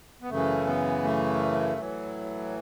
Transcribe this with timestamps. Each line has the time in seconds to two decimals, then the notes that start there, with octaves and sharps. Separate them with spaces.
0.22 B3
0.30 F#2 C#3 E3 A3
0.67 B3
1.04 A3
1.78 A2 E3 F#3